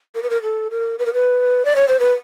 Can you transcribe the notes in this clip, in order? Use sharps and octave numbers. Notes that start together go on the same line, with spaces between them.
A#4
B4
A#4
A4
A#4
B4
A#4
B4
D5
C#5
C5
B4